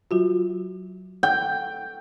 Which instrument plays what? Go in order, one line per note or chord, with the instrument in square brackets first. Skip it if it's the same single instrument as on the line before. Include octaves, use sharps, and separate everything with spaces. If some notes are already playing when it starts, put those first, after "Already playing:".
[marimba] F#3 F4 F#4
[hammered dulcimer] G5